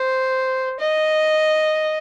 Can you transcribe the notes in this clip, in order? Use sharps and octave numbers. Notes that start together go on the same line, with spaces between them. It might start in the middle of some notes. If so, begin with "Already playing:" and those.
Already playing: C5
D#5